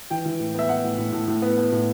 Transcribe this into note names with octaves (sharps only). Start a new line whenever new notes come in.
E3 G5
E3
A2
B3 E5
B3 F#5
A2
A2
A2
A2
B3
B3
A2